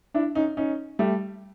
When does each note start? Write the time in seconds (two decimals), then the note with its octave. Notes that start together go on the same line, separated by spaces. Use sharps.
0.14 D4 E4
0.35 C#4 D#4
0.57 C#4 D#4
0.99 G3 A3